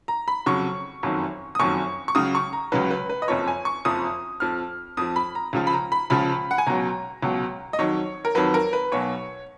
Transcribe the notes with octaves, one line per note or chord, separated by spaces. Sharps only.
A#5
B5
F2 C#3 F#3 C#6
F#1 F2 D#3 F#3
D#6
F#1 F2 D#3 F#3 C#6
C#6
C#2 C#3 F#3 D#6
C#6
A#5
C#2 C#3 F#3 B4
B4
B4
D#5
F#1 F2 F3 C#5
G#5
C#6
F#1 F2 F3 D#6
F2 F3 F6
F2 F3 D#6
B5
A#5
C#2 C#3 F3
B5
A#5
B5
C#2 C#3 F3 B5
F#5
G#5
C#2 B2 F#3 A#5
C#2 B2 F#3
D#5
F2 D#3 F#3 C#5
A#4
F2 D#3 F#3 B4
A#4
B4
B1 B2 F#3 C#5